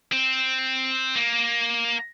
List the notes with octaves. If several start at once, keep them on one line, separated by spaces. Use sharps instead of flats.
C4
A#3